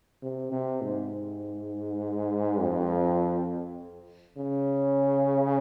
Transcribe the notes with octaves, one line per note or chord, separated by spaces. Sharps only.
C3
C3
G#2
F2
C#3